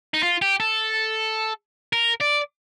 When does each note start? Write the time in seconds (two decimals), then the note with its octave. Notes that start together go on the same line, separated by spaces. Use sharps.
0.14 D#4
0.23 F4
0.42 G4
0.60 A4
1.93 A#4
2.21 D5